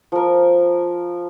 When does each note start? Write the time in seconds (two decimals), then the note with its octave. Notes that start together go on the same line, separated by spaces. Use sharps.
0.12 F3 A#4